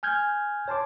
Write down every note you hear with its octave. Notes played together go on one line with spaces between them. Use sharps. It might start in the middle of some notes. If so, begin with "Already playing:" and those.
G#5 F6 G6 G#6
C#5 A5 C6 D6